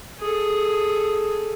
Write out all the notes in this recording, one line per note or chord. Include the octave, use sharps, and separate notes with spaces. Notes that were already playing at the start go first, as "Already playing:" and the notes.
G#4 A4